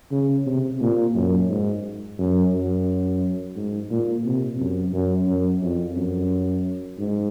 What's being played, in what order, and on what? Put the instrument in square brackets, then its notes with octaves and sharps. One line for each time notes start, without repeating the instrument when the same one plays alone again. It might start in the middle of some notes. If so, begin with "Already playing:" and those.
[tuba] C#3
C3
A#2
F#2
G#2
F#2
F#2
G#2
A#2
C3
F#2
F#2
F#2
F2
F#2
G#2